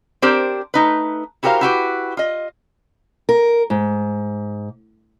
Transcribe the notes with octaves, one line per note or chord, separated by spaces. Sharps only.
C4 D4 G4 A#4 C5
A3 D#4 B4
E4 F#4 G4 A#4 C5 F5
E4 F#4 G4 B4
F4 D#5
A#4
G#2